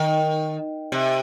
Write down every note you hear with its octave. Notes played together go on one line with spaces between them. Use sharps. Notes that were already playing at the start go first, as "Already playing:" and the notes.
Already playing: D#3
C3